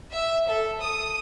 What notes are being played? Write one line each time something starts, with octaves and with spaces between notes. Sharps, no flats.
E5
A4
D#6